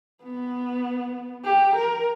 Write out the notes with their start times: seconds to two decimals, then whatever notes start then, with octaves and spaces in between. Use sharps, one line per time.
0.23 B3
1.45 G4
1.76 A#4